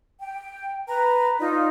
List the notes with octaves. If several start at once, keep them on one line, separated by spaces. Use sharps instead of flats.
G5
B4 A#5
D#4 F4 D5